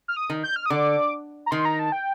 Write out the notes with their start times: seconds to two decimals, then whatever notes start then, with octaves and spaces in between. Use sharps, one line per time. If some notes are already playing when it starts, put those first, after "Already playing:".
0.08 F6
0.16 D#6
0.30 D#3
0.43 G6
0.56 F6
0.66 D#6
0.70 D3 D6
1.46 A#5
1.51 D#3 C6
1.65 A#5
1.79 A5
1.92 G5